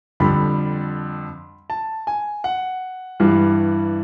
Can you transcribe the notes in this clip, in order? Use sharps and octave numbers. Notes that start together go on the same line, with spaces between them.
F2 D3 G3 B5
A5
G#5
F#5
G2 E3 G3